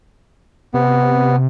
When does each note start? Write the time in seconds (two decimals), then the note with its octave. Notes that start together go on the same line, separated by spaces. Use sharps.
0.74 C3 B3